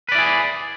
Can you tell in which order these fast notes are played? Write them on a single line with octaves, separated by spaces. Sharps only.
B4 D5 E4 G#4